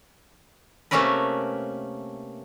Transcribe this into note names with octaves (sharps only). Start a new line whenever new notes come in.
C3 A3 A#3 C#4 A#4 B4